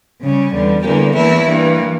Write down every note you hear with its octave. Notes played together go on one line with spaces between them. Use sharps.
C#3 G3 C#4
E2 D3 G3
E2 D3 G3 A#3 G4
E2 E3 A#3 E4
G2 E3 A#3